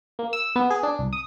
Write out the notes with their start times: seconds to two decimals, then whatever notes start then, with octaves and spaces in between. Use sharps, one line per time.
0.19 A#3
0.33 E6
0.56 B3
0.70 G#4
0.83 D4
0.99 C2
1.13 D#6